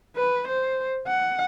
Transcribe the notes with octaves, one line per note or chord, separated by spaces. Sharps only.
B4
C5
F#5